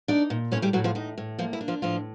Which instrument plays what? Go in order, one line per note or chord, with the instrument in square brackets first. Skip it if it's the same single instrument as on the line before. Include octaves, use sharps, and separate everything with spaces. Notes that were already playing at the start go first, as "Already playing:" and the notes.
[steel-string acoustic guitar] D4 D#4 D5
A#2
A2 C#4 C#5
G3 G4
A2 F#3 F#4
F3 F4
A2 D#4
A2
F3 A#3 F4
E4
D4
F3 F4
A2 F3 F4